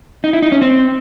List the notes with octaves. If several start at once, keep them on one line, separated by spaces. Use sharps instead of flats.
D#4
E4
D#4
C#4
C4